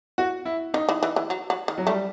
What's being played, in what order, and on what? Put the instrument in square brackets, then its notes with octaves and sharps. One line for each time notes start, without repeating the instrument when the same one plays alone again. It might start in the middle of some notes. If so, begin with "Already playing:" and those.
[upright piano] F#4
E4
[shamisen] D#3 [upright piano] D#4
[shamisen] E3
E3
E3
F#3
F#3
D#3
[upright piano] F#3
[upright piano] G3 [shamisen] A3